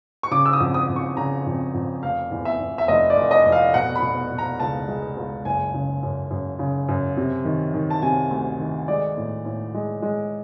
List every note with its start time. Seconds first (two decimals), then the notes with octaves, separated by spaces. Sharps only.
0.23 C#6
0.31 C#3 D6
0.46 E6
0.53 D#6
0.60 F2
0.74 D#6
0.88 F2
0.96 C#6
1.17 C#3 A#5
1.46 F2
1.74 F2
2.03 F1 F5
2.31 E2
2.45 E5
2.60 E2
2.78 E5
2.88 F1 D#5
3.10 D5
3.17 F1
3.31 D#5
3.46 F1
3.52 F5
3.74 B2 F#5
3.96 B5
4.02 B2
4.31 B2
4.38 A#5
4.60 C#2 A5
4.88 G#3
5.16 C#2
5.45 F#1 G#5
5.74 C#3
6.03 F#2
6.31 F#2
6.59 C#3
6.88 F#2
7.17 C3
7.45 D#3
7.74 D#3
7.90 A5
8.02 C3 G#5
8.31 D2
8.59 D#3
8.88 G#3 D5
9.17 A2
9.45 A2
9.74 G#3
10.02 G#3